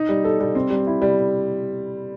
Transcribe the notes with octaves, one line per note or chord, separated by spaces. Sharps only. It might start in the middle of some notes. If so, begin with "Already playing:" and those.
Already playing: D#4
G3
A4
G3
C4
G3
E4
G3